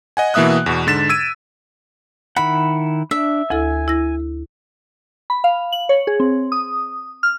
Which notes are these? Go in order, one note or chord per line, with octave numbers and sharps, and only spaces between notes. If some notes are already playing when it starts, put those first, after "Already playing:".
D#5 F#5 G#5
B2 E3 A#3 E5 D#6 F#6
E2 B2
G#2 D3 A6 B6 E7
E6 G#6 D7 D#7
D#3 E4 F#5 B5
D4 E5
D2 E4 A4 G#5
E4 A#6
B5
F5
F#7
C#5
G#4
C4
D#6
F6